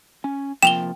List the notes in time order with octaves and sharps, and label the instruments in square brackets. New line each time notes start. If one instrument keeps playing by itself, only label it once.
[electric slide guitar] C#4 G#5
[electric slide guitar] C3 F3 A#3 [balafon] G5 [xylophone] E7 F7 G7